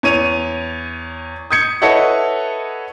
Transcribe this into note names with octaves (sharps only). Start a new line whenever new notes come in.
E2 C#5 D#7 F7
D#6 G6 G#6 C#7
E4 A4 B4 C#5 D#5 F#5